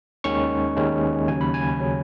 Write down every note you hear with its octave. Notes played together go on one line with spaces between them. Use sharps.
D#2 D#3 G#3 C#4 C#6
D#2 D#3 G#3 C#4
D#2 C#3 F#3 C#4 G#5
B5
G#5
C#3 F#3 C#4